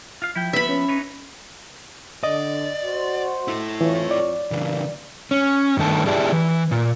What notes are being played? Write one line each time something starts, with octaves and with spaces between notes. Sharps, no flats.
F4 F5
F3 E4 G5
F3 B3 B4 E5 B5
C#4
D#4 B4 C#5
D3 D5 D#5
F#4 C5
E4 A4
F2 E3 F4 C#5
D5
G2 C#3 E3 A#3
C#4
G2 D#3 A3 A5
E4 G4 G#4 D5 E5 A5
E3
A#2